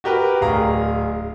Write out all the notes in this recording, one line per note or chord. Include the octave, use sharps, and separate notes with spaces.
F#4 G4 A#4 B4
D1 G#4 F5 A#5